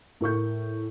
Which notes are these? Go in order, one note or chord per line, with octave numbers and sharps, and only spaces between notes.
A2 A#4 C#6 G6